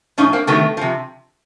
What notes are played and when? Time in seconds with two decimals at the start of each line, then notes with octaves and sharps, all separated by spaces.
0.18 A2 F3 C#4 D#4
0.33 A#3 C4
0.47 C3 D#3 F#3 A3 B3
0.77 C3 F3